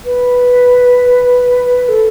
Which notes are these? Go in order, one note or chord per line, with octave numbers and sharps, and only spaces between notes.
B4
A4